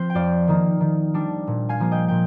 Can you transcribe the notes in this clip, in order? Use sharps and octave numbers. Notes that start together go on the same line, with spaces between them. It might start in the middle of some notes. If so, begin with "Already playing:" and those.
Already playing: F3 C4 C5
G5
F2 D5 F5
D#3 A#3 D#4
D#3
G3 D4
A#2
F5 G#5
F3 A#3
D#5 G5
A#2 G5